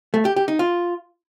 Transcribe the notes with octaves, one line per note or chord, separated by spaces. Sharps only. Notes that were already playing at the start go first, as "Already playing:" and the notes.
A3
G4
G4
D#4
F4